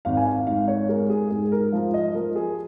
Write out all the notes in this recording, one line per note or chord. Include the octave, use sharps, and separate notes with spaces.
G#1 F5
G#5
F5
G#2 F5
C#5
G#3 A#4
G#4
G#2 G#4
G#4
A#4
F3 F5
D#5
F3 A#4
G#4